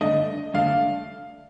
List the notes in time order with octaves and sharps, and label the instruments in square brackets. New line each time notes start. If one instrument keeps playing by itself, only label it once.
[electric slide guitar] G2 D3 A3 D4 [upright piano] D#5
[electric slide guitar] G2 D3 A3 D4 [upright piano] F5